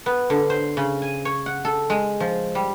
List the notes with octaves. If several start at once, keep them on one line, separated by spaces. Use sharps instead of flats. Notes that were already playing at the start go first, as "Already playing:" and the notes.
B3
D3
C5
C#3
G#5
C#5
F#5
A4
G#3
F3
G3